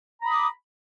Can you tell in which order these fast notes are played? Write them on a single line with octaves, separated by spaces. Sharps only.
A#5 B5 D#6 D6